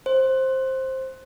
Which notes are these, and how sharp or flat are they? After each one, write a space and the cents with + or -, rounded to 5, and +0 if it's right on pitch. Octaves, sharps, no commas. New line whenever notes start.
C5 +10